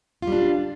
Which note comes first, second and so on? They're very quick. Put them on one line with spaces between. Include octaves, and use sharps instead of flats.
F4 G3 D4